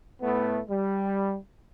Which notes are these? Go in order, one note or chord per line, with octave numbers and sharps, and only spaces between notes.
A2 A3 B3
G3